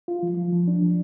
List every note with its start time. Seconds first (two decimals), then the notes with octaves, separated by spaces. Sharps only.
0.08 F4
0.23 F3
0.37 F3
0.53 F3
0.68 D4
0.82 F3